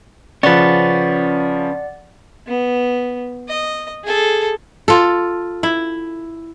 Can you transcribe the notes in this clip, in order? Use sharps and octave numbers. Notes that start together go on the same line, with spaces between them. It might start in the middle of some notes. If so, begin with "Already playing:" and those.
C#3 F3 C#4 B4 D5 F#5 A6
B3
D#5
G#4 A4
F4 A4
E4